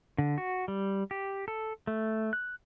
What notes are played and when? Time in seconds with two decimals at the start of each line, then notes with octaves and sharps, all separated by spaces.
0.18 D3
0.38 F#4
0.68 G3
1.11 G4
1.48 A4
1.87 A3
2.33 F#6